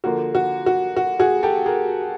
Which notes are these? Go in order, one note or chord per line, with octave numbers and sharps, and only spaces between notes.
D3 F3 A#3 F#4
F#4
F#4
F#4
F#4 G#4
G4 A4
G#4 A#4